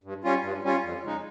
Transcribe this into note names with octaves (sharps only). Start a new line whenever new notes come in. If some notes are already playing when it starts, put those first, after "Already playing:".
G2
G3 C#4 F4
G2
G3 C#4 F4
F2
C#3 G#3 D#4